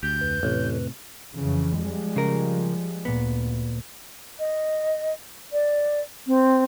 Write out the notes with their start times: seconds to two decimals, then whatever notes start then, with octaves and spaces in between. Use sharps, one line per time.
0.03 D2 G4 G6
0.21 F2 B4
0.43 A1 A2 C3
1.33 F2 C#3 E3
1.80 F3 G3 G#3
2.16 C#3 A#4
3.05 D2 A#2 B3
4.39 D#5
5.52 D5
6.27 C4